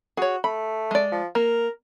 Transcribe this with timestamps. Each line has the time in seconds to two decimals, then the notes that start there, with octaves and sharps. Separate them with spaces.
0.17 F#4 G#4 C#5
0.44 A3 B5
0.91 G#3 D5
1.12 F3
1.35 A#3 A#4